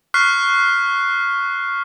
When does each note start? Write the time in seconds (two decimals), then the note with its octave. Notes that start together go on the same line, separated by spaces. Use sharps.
0.14 C#6 F6 F#6 B6 C7